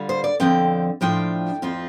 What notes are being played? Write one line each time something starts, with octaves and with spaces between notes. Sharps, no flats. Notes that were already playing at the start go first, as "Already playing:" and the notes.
Already playing: D3 G3 F4
C5
D5
F2 D3 F3 C4 G5
A2 F3 D4 F4 G5
F2 F3 C4 F4